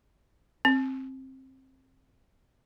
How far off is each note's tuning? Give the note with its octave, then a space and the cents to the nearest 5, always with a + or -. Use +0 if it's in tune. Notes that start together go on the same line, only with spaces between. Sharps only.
C4 +15